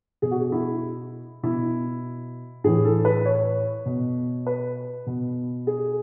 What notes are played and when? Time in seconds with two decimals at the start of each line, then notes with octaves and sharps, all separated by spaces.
0.22 B2 G#4
0.31 F#4
0.41 G#4
0.52 E4
1.43 B2 E4
2.64 A2 E3 G#4
2.84 A4
3.05 B4
3.26 C#5
3.86 B2
4.47 B4
5.07 B2
5.67 G#4